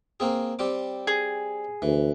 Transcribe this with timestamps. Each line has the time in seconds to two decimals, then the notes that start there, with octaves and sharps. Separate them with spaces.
0.20 A#3 C4 G#4
0.59 G3 C4 D6
1.07 G#4
1.82 D2 E3